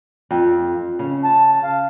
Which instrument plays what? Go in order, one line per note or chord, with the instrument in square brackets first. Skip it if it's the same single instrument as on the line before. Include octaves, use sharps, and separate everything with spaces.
[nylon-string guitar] F2
C#3
[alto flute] A5
F5